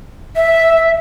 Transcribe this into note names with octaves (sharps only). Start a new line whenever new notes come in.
E5